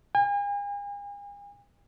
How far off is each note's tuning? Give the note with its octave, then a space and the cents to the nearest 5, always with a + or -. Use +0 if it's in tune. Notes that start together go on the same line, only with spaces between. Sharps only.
G#5 -40